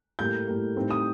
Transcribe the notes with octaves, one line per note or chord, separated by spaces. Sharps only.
A2 G3 A#3 G6
A2 G3 A#3
A2 G3 C4 D#4
D#6